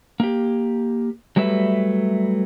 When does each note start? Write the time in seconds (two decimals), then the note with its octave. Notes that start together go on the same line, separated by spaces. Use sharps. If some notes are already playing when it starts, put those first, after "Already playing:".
0.20 A#3 G4
1.36 F#3 G3 A3 B4 E5